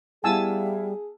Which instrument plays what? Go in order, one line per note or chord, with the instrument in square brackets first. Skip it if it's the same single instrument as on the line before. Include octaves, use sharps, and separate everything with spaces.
[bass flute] G3 [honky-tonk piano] B3 E4 F5 [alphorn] G#4 [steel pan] G#5 A5 E6